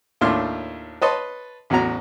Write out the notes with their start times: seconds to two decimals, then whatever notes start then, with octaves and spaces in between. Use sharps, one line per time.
0.21 D#2 A2 D4 F4 C6 F6
1.01 B4 C#5 D#5 A5 C6
1.70 A1 E2 F#3 F#4 A#5